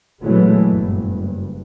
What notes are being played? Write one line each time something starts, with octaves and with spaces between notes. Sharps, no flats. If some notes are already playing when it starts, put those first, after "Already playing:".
A#2 E3 F#3 G#3 A3 B3
F#1 G2